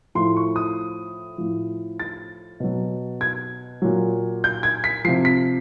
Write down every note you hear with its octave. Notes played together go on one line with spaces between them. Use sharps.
A2 F3 C6
C#6
D#6
A2 F3
A6
B2 F#3
G#6
A#2 F#3
G6
G#6
B6
C3 F3 C7
B6